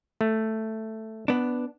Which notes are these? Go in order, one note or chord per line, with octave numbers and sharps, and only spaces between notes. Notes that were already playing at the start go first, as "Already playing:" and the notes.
A3
B3 D4